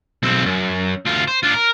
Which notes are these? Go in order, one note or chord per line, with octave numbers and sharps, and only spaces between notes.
B1 C4
F#2
D2 F4
C5
D4 F4
A#4